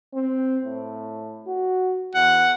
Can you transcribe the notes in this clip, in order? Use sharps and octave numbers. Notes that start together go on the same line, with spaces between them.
C4
A2
F#4
E2 F#5